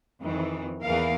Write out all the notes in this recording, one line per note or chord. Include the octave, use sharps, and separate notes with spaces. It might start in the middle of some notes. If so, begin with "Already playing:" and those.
F2 D#3 E3
E2 E3 A#4 F5